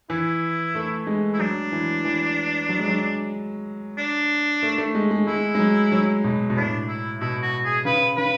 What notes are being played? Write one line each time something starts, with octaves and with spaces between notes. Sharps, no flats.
E3 E4
A3
G#3
E4
F#3 D4
E3
E3
F#3
G#3
F#3
D4
A3
A3
G#3
G#3
G#3 E4
G#3
F#3
F#3
B2
B2
A2 D4
E4
B2 E4
F#4
G#4
C#3 B4
C#3 B4